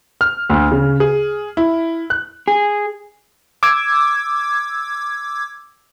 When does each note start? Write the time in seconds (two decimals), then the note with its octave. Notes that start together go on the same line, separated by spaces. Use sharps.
0.21 F6
0.50 D2
0.72 C#3
1.00 G#4
1.57 E4
2.10 F#6
2.48 G#4
3.63 D6 E6 G#6